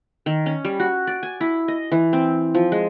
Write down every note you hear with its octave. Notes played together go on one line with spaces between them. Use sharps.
D#3
C#4
G3
F#4
D5
G#5
E4
D#5
E3
C4
F3
G#3